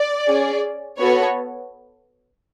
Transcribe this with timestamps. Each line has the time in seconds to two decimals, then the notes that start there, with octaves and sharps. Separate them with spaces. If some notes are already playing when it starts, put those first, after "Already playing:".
Already playing: D5
0.28 C#4 G#4
0.98 B3 F#4 A4 C#5